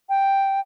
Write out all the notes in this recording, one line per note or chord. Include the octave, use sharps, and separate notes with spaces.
G5